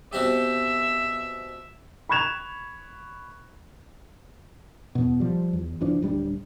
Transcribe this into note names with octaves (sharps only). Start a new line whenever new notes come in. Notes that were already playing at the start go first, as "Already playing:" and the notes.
B2 C4 G4 E5
B5 C#6 F#6 G#6 E7 F7
E2 B2
F3 G3
E2
F#1 E3 F3 D4
D1 G3 D4